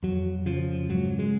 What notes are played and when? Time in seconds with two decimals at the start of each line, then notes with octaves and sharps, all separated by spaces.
0.03 F2 F#3
0.46 C#3 F3
0.89 G#2 F#3
1.19 G#3